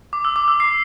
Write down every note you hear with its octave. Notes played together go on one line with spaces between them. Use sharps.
D6
E6
D6
E6
C7